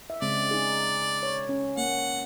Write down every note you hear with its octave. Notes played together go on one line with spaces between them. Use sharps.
E5
C#3 G#3 C4 D5
D#4 G#4
C#5
C#4
A#3 F#5